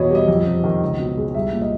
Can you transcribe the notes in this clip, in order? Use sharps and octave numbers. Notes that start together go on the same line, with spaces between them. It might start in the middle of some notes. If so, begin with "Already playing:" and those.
Already playing: E2 B2 C#5 D#5
G3 D#5
F2
C3
D#3
C#2
B2
G#3
C2 E5
A#2
D#5